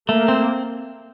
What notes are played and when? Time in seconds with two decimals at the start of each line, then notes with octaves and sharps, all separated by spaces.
0.09 A3 A#3
0.28 C4